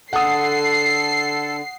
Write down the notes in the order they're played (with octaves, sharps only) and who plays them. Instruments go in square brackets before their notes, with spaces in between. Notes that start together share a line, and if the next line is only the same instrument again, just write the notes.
[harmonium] D3 [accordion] A4 [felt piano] F#5 D#6 [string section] C7